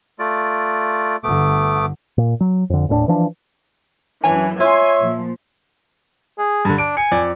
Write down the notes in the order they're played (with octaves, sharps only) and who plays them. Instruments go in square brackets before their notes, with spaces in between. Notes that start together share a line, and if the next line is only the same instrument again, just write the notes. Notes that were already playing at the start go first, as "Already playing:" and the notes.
[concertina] A3 F4 D5
[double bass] G1 D3 [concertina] A3 B3 D6
[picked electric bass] A#2
F#3
F2 D3
D#1 A2 A#3 D4
E3 F3 D4
[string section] F#2 E3 [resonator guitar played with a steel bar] D4 C#5 G#5
[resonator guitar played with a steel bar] F4 [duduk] C#5 [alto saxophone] E5 [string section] G#5 C6
[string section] A#2 F3
[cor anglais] G#4
[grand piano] G2 D3
[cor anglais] D4 [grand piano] D7
[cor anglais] G#5 [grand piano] C#7
[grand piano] F2 D5